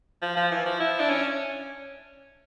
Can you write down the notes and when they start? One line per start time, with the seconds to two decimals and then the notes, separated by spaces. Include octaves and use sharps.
0.22 F3
0.36 F3
0.51 E3
0.66 F3
0.80 E4
1.00 D4
1.09 C#4